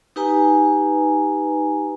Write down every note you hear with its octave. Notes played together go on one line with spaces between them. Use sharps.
D#4 G4 B4 G#5 A#5